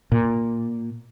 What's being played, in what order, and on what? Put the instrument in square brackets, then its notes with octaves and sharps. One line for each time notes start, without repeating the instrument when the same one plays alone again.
[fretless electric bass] A#2